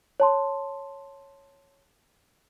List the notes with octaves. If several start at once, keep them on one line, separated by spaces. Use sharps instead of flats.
C#5 A5 C6